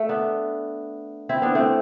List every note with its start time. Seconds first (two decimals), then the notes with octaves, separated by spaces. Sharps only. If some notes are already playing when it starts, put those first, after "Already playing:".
Already playing: A3
0.09 B3 D4
1.29 C4 E4
1.42 B3 D4
1.55 A3 C4